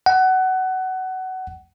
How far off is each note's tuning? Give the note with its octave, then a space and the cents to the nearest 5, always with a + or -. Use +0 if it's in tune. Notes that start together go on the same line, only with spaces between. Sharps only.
F#5 +20